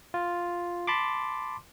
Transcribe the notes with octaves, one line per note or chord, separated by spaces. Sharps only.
F4
A5 B5 C6 D6